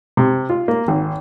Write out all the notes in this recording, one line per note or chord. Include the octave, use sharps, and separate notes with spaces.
C3
F4
A#3
G#1